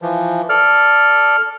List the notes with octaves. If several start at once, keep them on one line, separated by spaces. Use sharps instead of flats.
E3 F3
A4 D5 F6